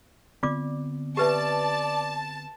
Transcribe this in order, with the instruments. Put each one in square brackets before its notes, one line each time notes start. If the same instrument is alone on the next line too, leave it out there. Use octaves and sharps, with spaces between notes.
[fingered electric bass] D3 B3 C4 [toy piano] F4 D5 D6
[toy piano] G4 B4 E5 [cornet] D5 [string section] A5